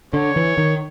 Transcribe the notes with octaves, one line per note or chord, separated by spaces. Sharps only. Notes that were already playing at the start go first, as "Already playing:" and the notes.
D3 C#5
E3
D#3